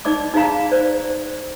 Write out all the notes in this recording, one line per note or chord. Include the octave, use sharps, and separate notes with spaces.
D#4 D5 D#5 D6
D#4 G#4 F5 A#5
C5 D5